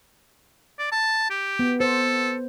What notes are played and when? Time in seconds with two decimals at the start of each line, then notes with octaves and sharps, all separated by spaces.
0.79 D5
0.92 A5
1.30 G4
1.59 B3
1.80 A4 C5